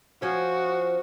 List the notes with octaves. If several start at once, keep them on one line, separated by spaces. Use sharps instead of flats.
F3 C#4 F#4